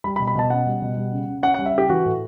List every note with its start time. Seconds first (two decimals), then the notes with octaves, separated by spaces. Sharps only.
0.04 G3 B5
0.16 B5
0.19 B2
0.27 B5
0.35 B2 A5
0.50 C#4 F#5
0.66 G3
0.82 B2
0.97 G3
1.12 C#3
1.28 C#3
1.43 C#4 F#5
1.54 G3 F#5
1.66 E5
1.74 C#3 G4
1.89 E3 F#4
2.05 A2